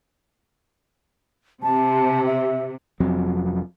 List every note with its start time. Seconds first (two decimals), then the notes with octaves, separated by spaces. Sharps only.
1.63 C3 A5
2.26 E5
3.00 F1 F2 F#3 C4